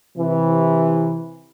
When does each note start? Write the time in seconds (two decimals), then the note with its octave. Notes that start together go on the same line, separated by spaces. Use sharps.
0.18 C3 E3